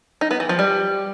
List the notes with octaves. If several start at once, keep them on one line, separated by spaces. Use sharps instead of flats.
D#4
B3
E3
F3
G3